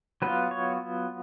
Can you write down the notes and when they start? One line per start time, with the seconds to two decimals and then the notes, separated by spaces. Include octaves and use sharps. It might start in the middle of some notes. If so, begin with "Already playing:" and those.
0.22 F#3 B3 F4 B4
0.51 C#5